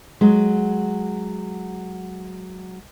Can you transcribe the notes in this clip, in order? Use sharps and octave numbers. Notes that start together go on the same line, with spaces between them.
F#3 G#3